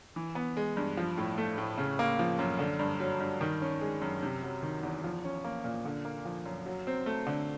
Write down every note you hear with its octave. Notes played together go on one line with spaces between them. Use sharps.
E3
B3
G#3
G2
F3
A2
A3
A2
C#3
A#3
F3
F#2
D3
G2
F#3
G2
D#3
C#4
G#3
F#2
C3
F#3
D#3
E2
F3
C#4
A#3
A#2
D3
A#3
F3
F#2
F#3
C4
A3
D3